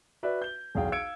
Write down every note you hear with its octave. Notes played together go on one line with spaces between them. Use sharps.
F#4 B4 D5 E5
G6 G7
B1 E2 G#4 F5 G5
F5 E6 G#6 C#7 D7